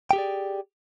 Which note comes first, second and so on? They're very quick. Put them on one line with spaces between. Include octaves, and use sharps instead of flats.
G5 G4 G#4 D5